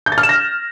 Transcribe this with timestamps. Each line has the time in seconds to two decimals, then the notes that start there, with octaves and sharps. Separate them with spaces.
0.06 G6
0.12 A6
0.18 F6
0.23 E7
0.29 A#6